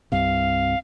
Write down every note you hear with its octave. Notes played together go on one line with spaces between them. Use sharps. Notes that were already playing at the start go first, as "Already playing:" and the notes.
C2 G2 C3 F5